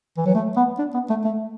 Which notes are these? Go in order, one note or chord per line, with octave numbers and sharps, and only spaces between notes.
E3
F#3
A3
B3
D4
B3
A3
A3